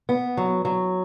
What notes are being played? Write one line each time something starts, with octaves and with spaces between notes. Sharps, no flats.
B3
F#3
F#3